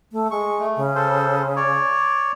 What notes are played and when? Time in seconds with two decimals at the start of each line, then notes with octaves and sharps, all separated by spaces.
0.12 A3
0.31 G#3 C#6
0.59 A3
0.77 C#3
0.95 A4 C5
1.56 C#5 D5